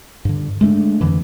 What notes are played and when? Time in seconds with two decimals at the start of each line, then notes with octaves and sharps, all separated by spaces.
0.25 G2 D3
0.61 G#3 A3 C#4 D4
1.01 F2 D3 E3